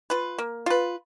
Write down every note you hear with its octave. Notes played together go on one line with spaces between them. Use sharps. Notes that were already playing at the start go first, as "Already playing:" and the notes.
F4 B4
A#3
F4 B4